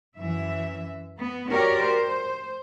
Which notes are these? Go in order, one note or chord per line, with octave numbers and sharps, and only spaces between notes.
F#2 E3 E5
B3
F#4 G4 A#4 C#5 D5
C5